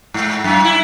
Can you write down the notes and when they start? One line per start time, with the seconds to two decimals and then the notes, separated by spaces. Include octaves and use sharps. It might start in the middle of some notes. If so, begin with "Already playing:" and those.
0.14 G#2
0.44 F#2
0.64 E4